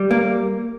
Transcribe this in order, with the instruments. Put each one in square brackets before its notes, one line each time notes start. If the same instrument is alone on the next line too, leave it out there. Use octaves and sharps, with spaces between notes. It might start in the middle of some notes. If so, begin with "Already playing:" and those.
Already playing: [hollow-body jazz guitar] G3
A#3